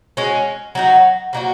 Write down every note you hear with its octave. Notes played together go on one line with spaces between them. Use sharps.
G#3 C#4 F#4
F#3 D#4 F#4
F#3 A#3 D#4 F#4